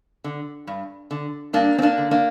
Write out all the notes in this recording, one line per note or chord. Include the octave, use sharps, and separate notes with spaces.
D3
G2
D3
G2 A#3 D4
C4
A#3 D4
D3
A#3 D4